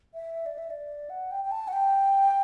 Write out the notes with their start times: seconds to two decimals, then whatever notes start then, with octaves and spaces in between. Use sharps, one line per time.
0.14 E5
0.46 D5
0.58 E5
0.70 D5
1.10 F#5
1.31 G5
1.45 G5
1.51 A5
1.68 F#5
1.73 G5